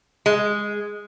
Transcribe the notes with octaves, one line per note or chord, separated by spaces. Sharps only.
G#3